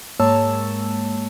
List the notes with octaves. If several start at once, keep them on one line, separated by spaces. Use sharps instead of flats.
G#2 G#3 A#3 C#5 A5 E6